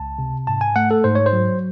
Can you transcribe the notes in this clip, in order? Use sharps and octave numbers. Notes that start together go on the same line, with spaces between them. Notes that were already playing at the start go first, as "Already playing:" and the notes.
Already playing: C#2 A5
C3
G#2 A5
G#5
A3 F#5
A4
G#2 C5
C#5
C5
F#3